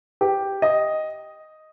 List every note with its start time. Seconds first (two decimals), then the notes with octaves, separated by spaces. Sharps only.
0.21 G4
0.62 D#5